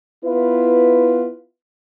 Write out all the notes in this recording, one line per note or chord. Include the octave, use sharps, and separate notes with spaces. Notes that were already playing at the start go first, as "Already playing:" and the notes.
B3 E4 F4 B4